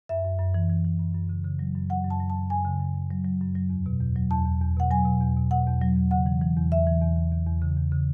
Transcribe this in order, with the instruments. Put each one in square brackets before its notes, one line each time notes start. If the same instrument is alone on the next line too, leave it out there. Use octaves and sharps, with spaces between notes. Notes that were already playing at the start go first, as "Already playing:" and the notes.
[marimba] F#2 E5
F#2
F#2
E3
E3
E3
F#2
F#2
C#3
C#3
F#3
F#2
F#3 F#5
F#2
A5
F#3
A5
F#2
F#2 G#5
C#3
F#2
F#2
F#3
F#3
F#2
F#3
E2
B2
E2
F#3
E2 A5
E2
E2
B2 F#5
F#3 G#5
B2
E2
B2
B2 F#5
E2
F#3
E2
C#3 F#5
E3
E3
E2
E2 E5
E3
E2
E2
E2
E2
C#3
E2
C#3